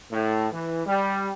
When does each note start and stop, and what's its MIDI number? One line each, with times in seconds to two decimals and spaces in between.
0.11 0.47 45
0.52 0.86 52
0.87 1.30 55